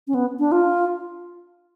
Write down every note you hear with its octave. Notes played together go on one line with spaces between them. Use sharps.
C#4
B3
D4
F4